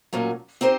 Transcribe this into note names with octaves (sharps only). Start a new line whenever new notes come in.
A#2 F#3 A3 C#4
C4 D#4 G4 C5